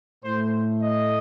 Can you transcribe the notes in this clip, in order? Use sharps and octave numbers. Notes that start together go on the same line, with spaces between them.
A2 A3 C5
D#5